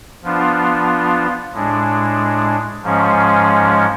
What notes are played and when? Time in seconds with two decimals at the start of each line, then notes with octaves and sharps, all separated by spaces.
0.23 F3 B3 D4 F4
1.52 A2 G#3 D4
2.82 G#2 F3 G#3 C#4